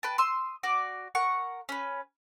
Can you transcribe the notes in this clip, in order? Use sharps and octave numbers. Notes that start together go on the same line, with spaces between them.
B4 G5 A5
C6 D#6 E6
F#4 D5 D6
A#4 F#5 C#6
C#4 B4